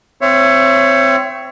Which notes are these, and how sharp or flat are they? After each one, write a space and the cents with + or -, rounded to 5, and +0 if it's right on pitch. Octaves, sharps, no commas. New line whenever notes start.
C4 -10 C#5 +0 E5 +30